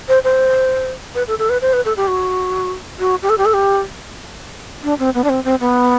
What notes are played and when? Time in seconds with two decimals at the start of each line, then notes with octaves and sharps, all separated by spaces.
0.08 C5
0.24 C5
1.15 B4
1.28 A4
1.39 A4
1.50 B4
1.62 C5
1.73 B4
1.85 A4
1.97 G4
2.08 F#4
2.99 F#4
3.22 G4
3.30 A4
3.38 G4
3.45 A4
3.54 G4
4.83 D4
4.99 C4
5.14 B3
5.24 D4
5.29 C4
5.45 C4
5.60 B3